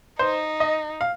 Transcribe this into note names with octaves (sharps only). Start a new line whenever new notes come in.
D#4 C5
D#5
F5